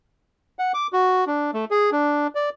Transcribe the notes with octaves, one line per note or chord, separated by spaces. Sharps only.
F#5
D6
F#4
D4
A3
G#4
D4
D5